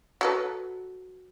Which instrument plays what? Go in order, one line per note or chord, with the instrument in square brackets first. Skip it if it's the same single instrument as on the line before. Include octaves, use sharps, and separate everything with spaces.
[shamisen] F#3 A4 B4